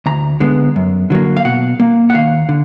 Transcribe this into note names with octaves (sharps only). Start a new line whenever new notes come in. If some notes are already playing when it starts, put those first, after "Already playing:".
D2 A#5
D3 G#3 B3
F#2
D3 F#3 A#3
F5
B2 F#5
A#3
F#5
D#2 F5
D3